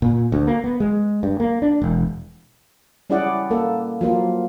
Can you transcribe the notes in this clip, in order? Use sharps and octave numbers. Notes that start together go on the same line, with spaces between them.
A#2
D2
A#3
B3
G#3
G2
A#3
D4
E1
G3 C#4 E4 G#4 D5 F#5
A#3 A4
F3 F#3 A#3 F4